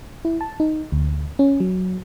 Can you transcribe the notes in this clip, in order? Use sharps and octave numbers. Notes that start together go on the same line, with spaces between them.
E4
A5
D#4
D2
C#4
F#3